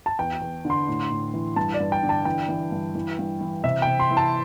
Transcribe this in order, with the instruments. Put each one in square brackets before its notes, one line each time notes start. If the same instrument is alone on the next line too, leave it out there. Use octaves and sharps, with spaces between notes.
[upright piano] A5
E2 G5
E2
D3
C6
A2
A2
E3
G2 A5
D5
G2
G5
D3
A5
E3 G5
E3
G2
E3
G2
E3
C3 E5
C3 G5
C6
E3
A5